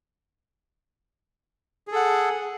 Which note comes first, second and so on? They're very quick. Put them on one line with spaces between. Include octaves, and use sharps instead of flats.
G#4 A4 F#5